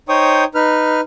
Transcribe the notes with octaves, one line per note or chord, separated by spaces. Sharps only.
D#4 C5 C#5 G5 C#6 D#6
D#4 B4 F6